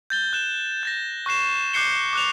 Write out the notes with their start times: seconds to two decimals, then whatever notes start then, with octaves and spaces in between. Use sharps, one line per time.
0.10 G6 A6 G7
0.33 F#6 E7
0.83 G6 A6 A#6
1.26 C#6 F#6 C7 E7
1.73 D6 F#6 G6 C7 C#7 G7
2.13 D6 F#6 F7